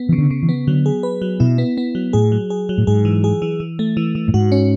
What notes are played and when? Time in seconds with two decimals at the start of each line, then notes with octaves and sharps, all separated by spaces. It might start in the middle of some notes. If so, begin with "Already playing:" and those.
Already playing: B3
0.09 E3
0.12 C#3
0.18 D3
0.31 C#3
0.43 E3
0.49 B3
0.67 D3 F#3
0.86 G#4
1.03 B4
1.22 F#3
1.40 B2 E4
1.58 B3
1.77 B3
1.95 F#3
2.13 A2 G#4
2.32 F#3
2.50 G#4
2.69 F#3
2.78 A2
2.87 G#2 G#4
3.05 E3
3.24 G#4
3.42 E3
3.60 E3
3.79 A3
3.97 E3
4.15 E3
4.28 A2
4.34 G#2 F#4
4.52 C#4